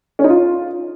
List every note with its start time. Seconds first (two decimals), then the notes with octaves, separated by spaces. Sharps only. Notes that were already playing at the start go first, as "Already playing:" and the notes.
0.19 C#4
0.24 D#4
0.30 F4